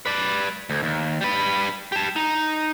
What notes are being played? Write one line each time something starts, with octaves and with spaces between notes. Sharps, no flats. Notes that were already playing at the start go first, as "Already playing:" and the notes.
B4 D5
D2
D#2
G3 B4
G4 A5
D#4